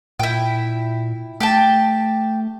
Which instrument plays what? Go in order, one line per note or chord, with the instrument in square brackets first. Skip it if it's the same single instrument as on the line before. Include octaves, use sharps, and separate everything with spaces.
[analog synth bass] A#2 [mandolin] E4 G5
[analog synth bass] A3 [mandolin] G4 G5 A5